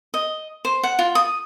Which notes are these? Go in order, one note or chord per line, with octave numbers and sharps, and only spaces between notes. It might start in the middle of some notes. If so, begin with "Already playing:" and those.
D#5
C5
F#5
F4
D#6